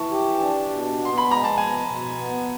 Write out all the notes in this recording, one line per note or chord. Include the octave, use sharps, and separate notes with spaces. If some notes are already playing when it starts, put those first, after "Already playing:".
Already playing: E3 A5 C#6
G4
D4
B2
B3
C6
B5
G#3 A#5
A5
B2 G#5
B2
B3